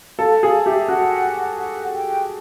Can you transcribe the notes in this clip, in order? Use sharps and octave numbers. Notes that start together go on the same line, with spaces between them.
A4 F5
G#4 F5
G4 E5
F#4 F#5
F#5
G5